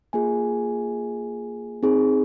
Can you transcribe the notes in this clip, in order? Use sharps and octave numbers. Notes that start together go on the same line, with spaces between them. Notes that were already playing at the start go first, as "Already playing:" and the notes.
A#3 F4 G#4 G#5
C4 D#4 G#4